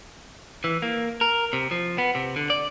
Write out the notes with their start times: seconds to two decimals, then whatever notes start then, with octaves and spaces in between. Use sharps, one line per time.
0.64 E3
0.82 A#3
1.21 A#4
1.53 C3
1.71 F3
1.98 B3
2.15 C3
2.36 D3
2.50 D5